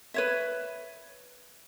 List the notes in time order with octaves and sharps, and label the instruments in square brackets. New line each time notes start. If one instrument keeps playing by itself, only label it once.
[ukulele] B4 C#5 E5